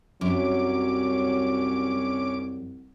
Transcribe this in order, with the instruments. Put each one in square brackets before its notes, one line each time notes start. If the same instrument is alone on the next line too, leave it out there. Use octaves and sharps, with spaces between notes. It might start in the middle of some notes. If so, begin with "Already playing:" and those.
[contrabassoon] C2 [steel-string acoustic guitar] F#2 [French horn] F#3 [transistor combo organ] C#4 D6